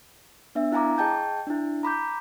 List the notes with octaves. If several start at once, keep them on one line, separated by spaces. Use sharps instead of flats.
B3 D4 E5
E4 F5 G#5 A#5 D6
G#4 D#5 G5 A5 G6
D4 E4
A#5 B5 D6 G6